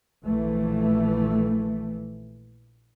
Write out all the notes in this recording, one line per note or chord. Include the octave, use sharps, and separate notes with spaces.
A#1 E3 A3